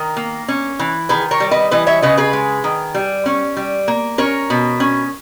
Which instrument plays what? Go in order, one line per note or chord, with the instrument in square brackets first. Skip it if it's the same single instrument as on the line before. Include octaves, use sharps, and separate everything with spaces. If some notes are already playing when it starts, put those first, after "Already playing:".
Already playing: [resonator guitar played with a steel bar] D#3 A#4
A#3
C#4
E3
D#3 G#4 B4
A#4 C#5
G3
B4 D#5
E3 B4 D#5
C#5 E5
C#3 B4 D#5
G#4 B4
G#3
D#3
G3
C#4
G3
A#3
C#4 A#4 C#5
B2
C#4